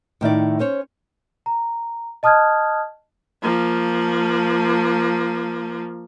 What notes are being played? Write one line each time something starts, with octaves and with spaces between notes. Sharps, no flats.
A2 D#3 E4 D5
C#4 C5 C#5
A#5
D#5 A5 D#6 F6 F#6 G#6
F3 A#3